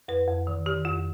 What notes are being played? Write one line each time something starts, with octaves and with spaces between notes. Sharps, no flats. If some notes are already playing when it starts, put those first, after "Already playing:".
F2 B4
F2
D#3
D#3 G4
F2 F4